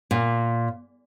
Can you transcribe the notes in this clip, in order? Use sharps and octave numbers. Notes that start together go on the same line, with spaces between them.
A#2